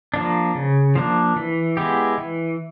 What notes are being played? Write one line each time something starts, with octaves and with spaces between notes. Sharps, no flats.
F3 A#3 D4
C#3
F3 A#3 D4
E3
G#3 B3 E4 G4
E3